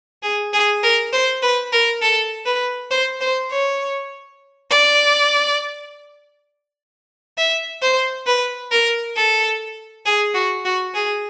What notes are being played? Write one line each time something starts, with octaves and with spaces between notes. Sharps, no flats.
G#4
G#4
A#4
C5
B4
A#4
A4
B4
C5
C5
C#5
D5
E5
C5
B4
A#4
A4
G#4
F#4
F#4
G#4